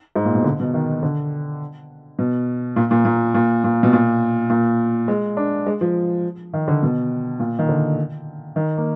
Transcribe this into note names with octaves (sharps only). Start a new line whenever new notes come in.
G#2
A#2
B2
D3
B2
D#3
D3
B2
A#2
A#2
A#2
A#2
A#2
B2
A#2
A#2
G#3
D4
G#3
F3
D#3
D3
B2
A#2
D#3
D3
D#3
A#3